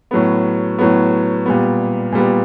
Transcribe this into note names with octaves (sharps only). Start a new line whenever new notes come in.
A2 F#3 B3
A2 F#3 B3
A#2 G3 B3
A#2 G3 B3